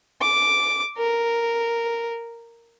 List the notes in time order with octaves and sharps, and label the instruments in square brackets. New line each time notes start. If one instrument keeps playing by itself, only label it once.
[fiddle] D6
A#4